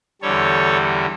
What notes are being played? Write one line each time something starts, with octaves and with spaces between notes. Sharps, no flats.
E2 D3 G3 A4 C#5